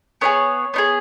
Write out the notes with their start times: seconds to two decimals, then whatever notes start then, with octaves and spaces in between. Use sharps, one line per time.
0.21 B3 D#4 G#4 C#5
0.74 B3 D#4
0.78 G#4